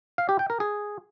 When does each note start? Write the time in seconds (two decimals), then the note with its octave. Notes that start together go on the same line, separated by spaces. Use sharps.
0.18 F5
0.29 G4
0.39 G5
0.50 A#4
0.60 G#4